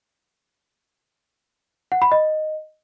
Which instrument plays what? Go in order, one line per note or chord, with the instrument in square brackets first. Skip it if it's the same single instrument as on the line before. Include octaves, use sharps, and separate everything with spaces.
[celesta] F#5
B5
D#5